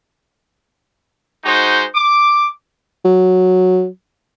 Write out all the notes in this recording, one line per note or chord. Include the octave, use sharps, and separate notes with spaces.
G#3 D#4 F#4 C5
D6
F#3